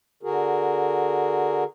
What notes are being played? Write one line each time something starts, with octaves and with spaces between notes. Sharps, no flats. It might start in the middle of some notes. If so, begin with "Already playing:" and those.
D3 F#4 G#4 A#4